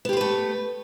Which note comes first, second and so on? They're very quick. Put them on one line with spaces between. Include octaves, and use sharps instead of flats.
B3 G4 C5 B4 A3